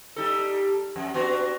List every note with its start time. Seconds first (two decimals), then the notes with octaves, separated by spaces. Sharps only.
0.16 G3 D#4 A4
0.96 F2
1.14 B3 D4 F#4